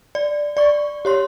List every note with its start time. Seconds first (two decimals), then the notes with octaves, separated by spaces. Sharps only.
0.15 D5
0.57 D5 C#6
1.05 G4 C#5 C6